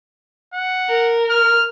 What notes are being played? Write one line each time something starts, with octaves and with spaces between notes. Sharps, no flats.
F#5
A#4
F6